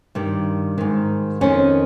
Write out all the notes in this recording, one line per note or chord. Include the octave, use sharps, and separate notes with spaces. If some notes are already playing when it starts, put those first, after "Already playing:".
G2 D#3
G#2 D#3
F2 D#3 C#4